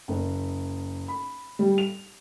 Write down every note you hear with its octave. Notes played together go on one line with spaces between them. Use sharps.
F#1
B5
G3
F7